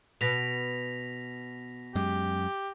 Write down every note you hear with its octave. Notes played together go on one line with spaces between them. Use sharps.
B2 A#6 B6 F7
F#2 G#3 G4